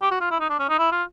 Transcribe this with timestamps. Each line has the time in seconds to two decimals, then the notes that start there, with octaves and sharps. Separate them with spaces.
0.02 G4
0.11 F#4
0.21 F4
0.31 E4
0.40 D#4
0.50 D4
0.59 C#4
0.69 D#4
0.78 E4
0.92 F4